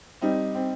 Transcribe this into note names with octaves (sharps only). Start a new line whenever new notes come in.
G3 C4 D#4
C4